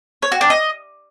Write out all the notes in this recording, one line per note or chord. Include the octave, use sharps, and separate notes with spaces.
C#5
F#4
D4
D#5